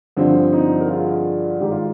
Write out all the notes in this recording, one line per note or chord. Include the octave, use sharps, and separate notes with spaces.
G2 D3 F3 C4
C4 D#4
A#4
F4 G#4
G#2 D#3 G4
F4